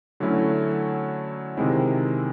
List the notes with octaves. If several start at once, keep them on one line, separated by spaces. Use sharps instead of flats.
D3 F#3 A3 C#4 E4
C3 D#3 G#3 C4 E4